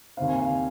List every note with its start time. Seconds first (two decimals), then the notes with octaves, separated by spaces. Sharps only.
0.17 D#2 D#3 C4 F5
0.28 G#5
0.40 F5